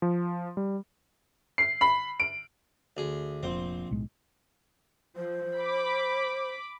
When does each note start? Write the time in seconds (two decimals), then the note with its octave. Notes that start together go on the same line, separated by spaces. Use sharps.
0.02 F3
0.57 G3
1.58 C7
1.81 B5
2.20 D7
2.97 D2 G#4
3.43 F1 A#1 C4
3.91 B1 A2 G#3
5.16 F3 C5
5.59 B5 D6